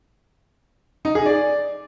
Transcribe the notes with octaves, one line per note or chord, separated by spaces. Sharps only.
D#4
G#4
D5